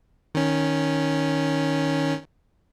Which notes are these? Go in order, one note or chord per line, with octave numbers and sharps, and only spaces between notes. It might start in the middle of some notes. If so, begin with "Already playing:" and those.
D#3 C#4